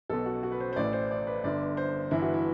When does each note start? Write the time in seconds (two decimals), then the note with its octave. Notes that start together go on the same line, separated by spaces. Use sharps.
0.10 B1 B2 A4
0.26 F#4
0.43 F#4
0.52 B4
0.61 C5
0.73 C5
0.76 A1 A2 E3 D5
0.93 C5
1.11 D5
1.27 B4
1.44 G1 G2 D3 D5
1.77 C5
2.11 G1 G2 E3 E4
2.22 F#4
2.34 E4